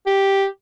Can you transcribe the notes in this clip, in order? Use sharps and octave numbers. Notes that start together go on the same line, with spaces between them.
G4